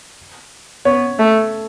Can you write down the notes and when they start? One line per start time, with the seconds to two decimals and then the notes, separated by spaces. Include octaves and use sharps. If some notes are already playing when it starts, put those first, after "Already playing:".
0.85 B3 C#5
1.19 A3